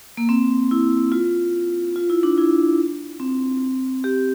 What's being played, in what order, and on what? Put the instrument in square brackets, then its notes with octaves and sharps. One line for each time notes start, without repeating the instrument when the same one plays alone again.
[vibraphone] A#3
C4
E4
F4
F4
E4
D4
E4
C4
G4